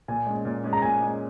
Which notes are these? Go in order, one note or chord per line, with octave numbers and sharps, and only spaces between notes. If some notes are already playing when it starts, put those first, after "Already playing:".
A#2 G#5
G#3 C#4
A#2
G#3 C#4
A#5
A#2 G#5
G#3 C#4